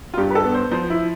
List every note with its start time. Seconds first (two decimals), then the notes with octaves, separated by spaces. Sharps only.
0.14 F4
0.17 G2 G4
0.30 B4
0.35 A4
0.44 B3
0.54 C5
0.71 F3 C5
0.90 E4